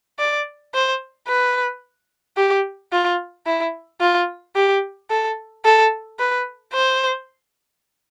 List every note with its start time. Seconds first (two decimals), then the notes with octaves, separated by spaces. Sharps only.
0.19 D5
0.74 C5
1.28 B4
2.37 G4
2.92 F4
3.46 E4
4.01 F4
4.55 G4
5.10 A4
5.65 A4
6.19 B4
6.73 C5